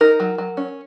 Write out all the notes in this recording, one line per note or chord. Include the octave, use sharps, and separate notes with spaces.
D#4 A#4
F#3
F#3
C#4